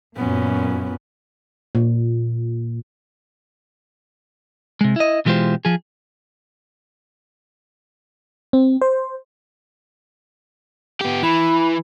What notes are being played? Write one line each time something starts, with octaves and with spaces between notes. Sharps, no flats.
F#2 A#2 B3 C#4
A#2
C3 G#3
E4 D#5
B2 E3 G#3 F4 G4 C5
F3 G#4
C4
C5
B3 G4
E3 B5